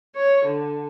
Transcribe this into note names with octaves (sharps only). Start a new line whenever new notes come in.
C#5
D3